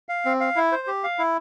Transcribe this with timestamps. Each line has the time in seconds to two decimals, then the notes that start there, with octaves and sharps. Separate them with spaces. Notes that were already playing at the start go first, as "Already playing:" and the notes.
0.09 F5
0.25 C4
0.41 F5
0.56 E4
0.72 C5
0.87 G4
1.04 F5
1.19 E4